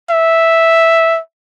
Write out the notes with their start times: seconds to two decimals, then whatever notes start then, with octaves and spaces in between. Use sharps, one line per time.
0.10 E5